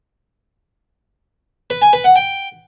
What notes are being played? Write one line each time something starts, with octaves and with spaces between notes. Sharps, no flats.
B4
G#5
B4
F#5
G5